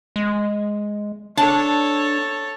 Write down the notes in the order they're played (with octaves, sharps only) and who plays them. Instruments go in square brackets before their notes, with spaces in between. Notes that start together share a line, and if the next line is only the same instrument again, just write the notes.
[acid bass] G#3
[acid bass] D4 [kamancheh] A4 C#5 [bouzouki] A5